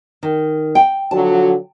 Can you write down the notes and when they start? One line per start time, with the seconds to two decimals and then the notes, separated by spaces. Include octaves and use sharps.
0.23 D#3
0.75 G5
1.11 D3 F3 F#3 A5